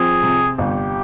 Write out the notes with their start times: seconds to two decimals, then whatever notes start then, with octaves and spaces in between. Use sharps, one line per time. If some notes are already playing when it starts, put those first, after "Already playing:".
Already playing: F3 C4 G#4
0.23 C3
0.58 G1 G4